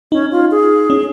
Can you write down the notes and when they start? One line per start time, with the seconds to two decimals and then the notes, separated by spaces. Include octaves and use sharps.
0.12 C#4 D#4
0.32 F4
0.51 G#4
0.90 C#4